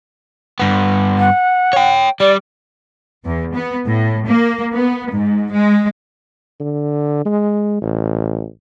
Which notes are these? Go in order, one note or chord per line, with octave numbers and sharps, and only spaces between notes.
G2 B3
F#5
C#5 G5
G3 D5
E2
B3
A2
A#3
B3
G#2
G#3
D3
G#3
A1